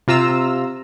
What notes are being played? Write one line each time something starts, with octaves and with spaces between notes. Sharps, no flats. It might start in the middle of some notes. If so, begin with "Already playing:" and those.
C3 F4 A#5 E6